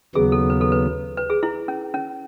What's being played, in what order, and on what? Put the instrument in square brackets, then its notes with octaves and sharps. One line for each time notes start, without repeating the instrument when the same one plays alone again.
[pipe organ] D#2 C#3 F#3 B3 [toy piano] G#4
[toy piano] A4
B4
A4
B4
B4
G#4
E4
C#4
C#4